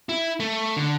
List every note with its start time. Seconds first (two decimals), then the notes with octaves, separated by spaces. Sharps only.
0.09 E4
0.40 A3
0.77 D3